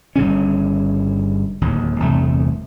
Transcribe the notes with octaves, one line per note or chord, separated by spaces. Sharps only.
G1 G2 C#3 C#4
D1 D#2
G1 E2 C3 A3